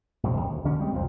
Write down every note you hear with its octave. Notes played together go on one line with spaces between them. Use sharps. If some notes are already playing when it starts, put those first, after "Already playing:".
A#1 F#2 F3
D#2
D2
D2 D3 C#4
G3 G#3 C4
C2 F2 A#2 F3